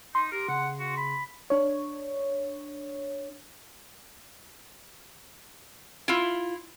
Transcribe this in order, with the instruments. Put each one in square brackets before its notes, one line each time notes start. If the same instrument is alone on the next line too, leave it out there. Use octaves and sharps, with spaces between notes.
[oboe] D#4 [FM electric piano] C6
[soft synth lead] G4 [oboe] A#4
[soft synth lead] C#3 [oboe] F#5
[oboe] F#4
B5
[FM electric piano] D4 C#5
[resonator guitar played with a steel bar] E4 F4